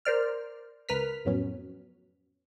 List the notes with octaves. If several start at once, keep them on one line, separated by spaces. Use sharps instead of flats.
A#4 C5 D5 F6
C#2 A#4 B4 F6 B6
F2 A2 F#3 B3 C#4